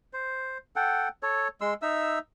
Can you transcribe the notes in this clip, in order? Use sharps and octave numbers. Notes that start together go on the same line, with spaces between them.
C5
A4 F#5 G5
A4 C#5
G#3 C6 E6
D#4 E5 E6